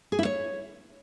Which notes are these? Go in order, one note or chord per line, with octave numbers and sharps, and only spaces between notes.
G#4
E4
C#5